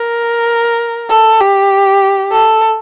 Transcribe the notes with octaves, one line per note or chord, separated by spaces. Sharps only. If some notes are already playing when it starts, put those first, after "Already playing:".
Already playing: A#4
A4
G4
A4